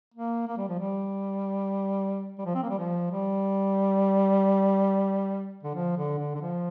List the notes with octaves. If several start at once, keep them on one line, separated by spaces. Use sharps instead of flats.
A#3
A#3
G3
F3
G3
G3
F3
C4
A#3
G3
F3
G3
D3
F3
D3
D3
D3
F3